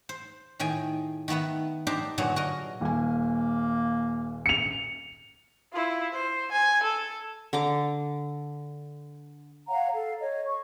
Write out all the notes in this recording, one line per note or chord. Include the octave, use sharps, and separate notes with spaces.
C5
A2 D#3 G#4 G5 G#5
D#3 A3 B3 E5 F#5
D4 D#4 G4 C5
G2 A#2 D3 F#3 G#4 F#5
F#4 A#4 D#5
D#1 A#3 G#5
C#7 F7
E4 F4
C5
G#5
A4
D3 A#5 D6
C#5 F5 F#5 A#5
A4 F5
C#5 D#5
C#6